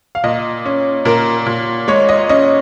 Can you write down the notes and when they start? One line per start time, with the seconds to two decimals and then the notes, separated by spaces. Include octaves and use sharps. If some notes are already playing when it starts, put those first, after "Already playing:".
0.15 F5
0.24 A#2 D#5
0.65 C#4
1.05 A#2 A#4
1.46 A#2
1.88 G#3 C#5
2.09 D#5
2.29 C#4 D#5